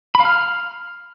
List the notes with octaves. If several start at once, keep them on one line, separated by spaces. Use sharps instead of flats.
B5
F5
F6